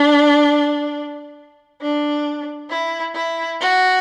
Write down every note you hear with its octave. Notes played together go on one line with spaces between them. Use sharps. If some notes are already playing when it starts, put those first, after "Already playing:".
Already playing: D4
D4
E4
E4
F#4